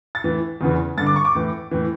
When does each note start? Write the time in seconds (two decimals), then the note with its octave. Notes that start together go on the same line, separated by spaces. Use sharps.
0.15 A6
0.24 A2 E3
0.61 E2 C#3 E3
0.98 G2 D3 A6
1.07 D6
1.16 C#6
1.25 D6
1.35 A2 E3
1.71 A2 E3